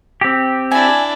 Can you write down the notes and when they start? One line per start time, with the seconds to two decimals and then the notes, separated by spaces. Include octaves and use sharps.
0.21 C4 G4
0.71 D4 E4 G#5